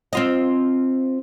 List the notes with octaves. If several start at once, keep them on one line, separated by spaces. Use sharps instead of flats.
C4 F4 D#5